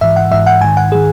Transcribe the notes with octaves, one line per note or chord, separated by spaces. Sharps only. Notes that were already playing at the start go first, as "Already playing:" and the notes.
G#2 E3 E5
F#5
G#2 E3 E5
F#5
G#2 D#3 G#5
F#5
D#3 G#4